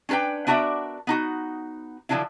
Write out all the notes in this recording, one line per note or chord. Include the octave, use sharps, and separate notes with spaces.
C#4 D4 A4 B4 G5
B3 D4 F#4 A#4 D5 E5
B3 D#4 F#4
D3 F3 F#3 D4 E4